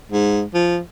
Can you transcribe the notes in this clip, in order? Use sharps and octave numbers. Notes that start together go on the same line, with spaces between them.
G#2
F3